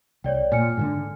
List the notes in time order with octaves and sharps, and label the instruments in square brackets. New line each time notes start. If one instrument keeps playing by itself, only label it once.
[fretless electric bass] C2 [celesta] C#5 D5 G5
[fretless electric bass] A#2 [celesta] G#5 F6 C#7
[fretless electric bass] G#2 B2 D3